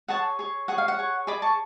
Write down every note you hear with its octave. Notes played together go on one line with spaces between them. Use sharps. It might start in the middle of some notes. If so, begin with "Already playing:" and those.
G#4 C#5 F#5 A5
G#4 C#5
G#4 C#5 F#5
F5
F#5
G#4 C#5
G#4 D5 B5 D6
A5 C#6